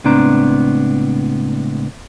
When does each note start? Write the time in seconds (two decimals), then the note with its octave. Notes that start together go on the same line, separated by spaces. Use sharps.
0.04 C#2 A2 B3 C4 D4 A#5